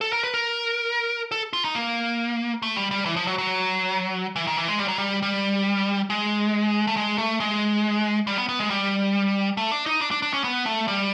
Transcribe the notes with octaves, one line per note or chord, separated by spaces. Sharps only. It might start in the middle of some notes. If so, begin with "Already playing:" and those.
A4
A#4
B4
A#4
A4
F4
D#4
A#3
A3
G3
G3
E3
F3
F#3
F#3
E3
D#3
E3
G#3
G3
F#3
G3
G3
G#3
A3
G#3
A3
G#3
G3
B3
B3
G#3
G3
A3
D4
D#4
D4
D4
D4
C#4
B3
A3
G3